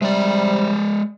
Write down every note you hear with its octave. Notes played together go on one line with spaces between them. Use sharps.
C3 G3 G#3 D5